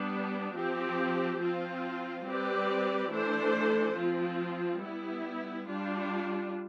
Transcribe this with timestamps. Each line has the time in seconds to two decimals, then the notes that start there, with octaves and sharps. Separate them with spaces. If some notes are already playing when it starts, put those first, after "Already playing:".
Already playing: G3 B3 D4
0.54 F3 C4 G4
1.40 F3 C4 F4
2.25 G3 C4 G4 B4 D5
3.10 E3 A3 D4 A4 C5
3.96 F3 C4 F4
4.81 G3 B3 E4
5.66 G3 D4 F4